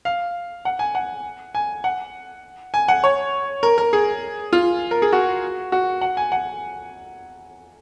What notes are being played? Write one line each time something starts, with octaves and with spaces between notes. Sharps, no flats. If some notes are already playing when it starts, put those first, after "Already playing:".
F5
F#5
G#5
F#5
G#5
F#5
G#5
F#5
C#5
A#4
A#4
G#4
F4
A#4
G#4
F#4
F#4
F#5
G#5
F#5